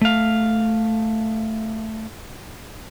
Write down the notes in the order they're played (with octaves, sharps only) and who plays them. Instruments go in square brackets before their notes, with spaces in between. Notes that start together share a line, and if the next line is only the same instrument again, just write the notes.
[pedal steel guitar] A3 F5